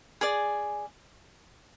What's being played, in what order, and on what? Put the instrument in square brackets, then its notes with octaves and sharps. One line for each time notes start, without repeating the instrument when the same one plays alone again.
[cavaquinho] G#4 D5 G#5